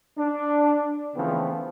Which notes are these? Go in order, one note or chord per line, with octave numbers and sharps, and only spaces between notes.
D4
C#3 E3 F3 A3 B3 C4